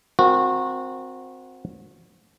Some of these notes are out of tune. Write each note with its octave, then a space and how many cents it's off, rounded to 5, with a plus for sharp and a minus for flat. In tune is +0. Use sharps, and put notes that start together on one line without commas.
C4 +0 F#4 -25 A#4 +5